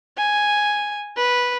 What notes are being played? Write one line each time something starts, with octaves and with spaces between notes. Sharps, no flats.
G#5
B4